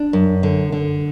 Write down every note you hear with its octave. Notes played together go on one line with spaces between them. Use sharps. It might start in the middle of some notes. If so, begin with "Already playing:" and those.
Already playing: D4
F#2
D3
D3